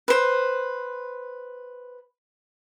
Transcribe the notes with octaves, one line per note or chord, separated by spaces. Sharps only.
B4 C5